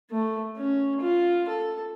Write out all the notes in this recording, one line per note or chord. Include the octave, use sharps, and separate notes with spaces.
A3
C#4
F4
A4